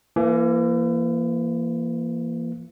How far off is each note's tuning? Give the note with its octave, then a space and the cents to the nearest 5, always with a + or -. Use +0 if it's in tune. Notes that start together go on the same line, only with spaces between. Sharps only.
E3 +35 A#3 +0